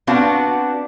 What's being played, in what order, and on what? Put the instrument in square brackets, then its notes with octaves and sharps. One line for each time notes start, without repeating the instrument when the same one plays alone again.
[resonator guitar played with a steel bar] B3 C4 D4 F#4 F5 F#5